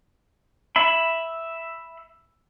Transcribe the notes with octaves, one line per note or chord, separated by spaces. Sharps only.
E5 B5